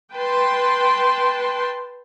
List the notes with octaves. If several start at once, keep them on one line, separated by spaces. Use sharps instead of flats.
B4 G5 A5 C6